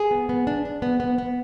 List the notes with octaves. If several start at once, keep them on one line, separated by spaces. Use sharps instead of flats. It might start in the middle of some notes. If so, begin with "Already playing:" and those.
Already playing: G#4
B3
B3
D4
D4
B3
B3
B3